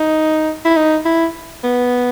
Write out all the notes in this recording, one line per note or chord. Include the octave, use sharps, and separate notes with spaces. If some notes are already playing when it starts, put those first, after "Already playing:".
Already playing: D#4
E4
D#4
E4
B3